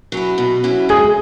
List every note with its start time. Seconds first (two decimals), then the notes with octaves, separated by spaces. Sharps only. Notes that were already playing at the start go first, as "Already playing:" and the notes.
0.12 F#3 C#4 E4
0.38 B2
0.64 F#3 C#4 E4
0.89 G#3 G#4